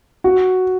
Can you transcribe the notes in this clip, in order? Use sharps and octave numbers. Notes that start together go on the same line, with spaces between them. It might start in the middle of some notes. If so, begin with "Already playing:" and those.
F#4